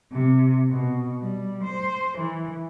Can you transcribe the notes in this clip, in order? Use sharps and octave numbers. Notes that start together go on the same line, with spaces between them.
C3
B2
G3
C5
E3